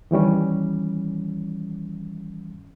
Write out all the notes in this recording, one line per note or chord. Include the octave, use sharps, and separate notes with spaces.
D#3 E3 G3 C#4